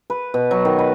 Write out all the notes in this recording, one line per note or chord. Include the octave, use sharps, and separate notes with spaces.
B4
B2
F#3
D#3
B4